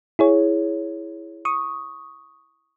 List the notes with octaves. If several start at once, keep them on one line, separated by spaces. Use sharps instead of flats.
E4 G#4 C#5
C#6 D#6